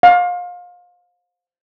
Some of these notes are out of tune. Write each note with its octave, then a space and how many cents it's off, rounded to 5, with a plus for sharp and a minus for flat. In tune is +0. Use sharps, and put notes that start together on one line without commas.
F5 +30